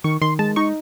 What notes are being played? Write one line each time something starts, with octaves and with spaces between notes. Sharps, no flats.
D#3 C#6
D#3 C6
G#3 A5
D#4 C#6